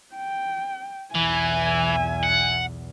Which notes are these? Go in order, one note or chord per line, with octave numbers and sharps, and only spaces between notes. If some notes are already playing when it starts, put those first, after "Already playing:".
G5
B1 E2 E3 E5 G#5
F#5